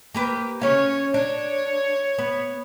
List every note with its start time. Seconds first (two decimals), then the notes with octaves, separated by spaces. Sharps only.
0.14 A#3 G4 B4
0.62 C#3 C#4 C#5 F5
1.14 D4 C#5
2.18 B3